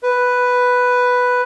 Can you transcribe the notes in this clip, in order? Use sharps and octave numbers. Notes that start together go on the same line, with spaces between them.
B4